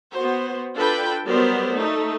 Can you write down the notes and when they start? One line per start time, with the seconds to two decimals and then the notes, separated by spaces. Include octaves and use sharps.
0.13 B3 F#4 C5
0.76 D4 F4 A4 B4 G5 B5
1.27 F#3 G3 B3 A#4 C5 D5
1.74 A3 D#4